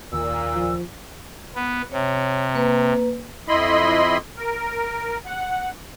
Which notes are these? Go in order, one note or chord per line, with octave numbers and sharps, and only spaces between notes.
D#2 A#2 D#3 E6
F3
B3
C3 C#5
A#3 B4
F2 E4 D#5 B5 C6
A#4
F#5